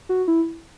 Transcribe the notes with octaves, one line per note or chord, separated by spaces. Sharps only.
F#4
E4